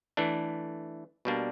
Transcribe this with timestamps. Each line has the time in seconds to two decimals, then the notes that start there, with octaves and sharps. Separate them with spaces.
0.17 E3 A3 D4
1.25 B2 G3 A#3 D4